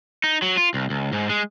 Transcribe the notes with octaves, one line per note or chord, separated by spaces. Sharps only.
D#4
F#3
F4
C2
C#2
G#2
G#3